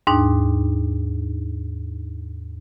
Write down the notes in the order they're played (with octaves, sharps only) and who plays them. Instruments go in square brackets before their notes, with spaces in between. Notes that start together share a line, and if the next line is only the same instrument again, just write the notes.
[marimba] D#2 G#2 D4 D#4